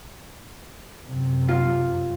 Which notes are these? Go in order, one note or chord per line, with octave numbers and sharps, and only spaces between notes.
F#2 C3
F4